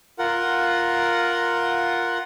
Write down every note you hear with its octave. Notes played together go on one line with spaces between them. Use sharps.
F4 A#4 F#5